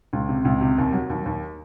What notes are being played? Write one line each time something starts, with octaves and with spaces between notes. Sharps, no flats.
C#2
C3
C#2
C3
D#2
F#3
D#2
D#2